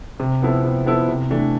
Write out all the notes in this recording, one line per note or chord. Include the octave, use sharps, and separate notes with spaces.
C3
F3 B3 E4 A4
C3
F3 B3 E4 A4
C3
E3 A3 D4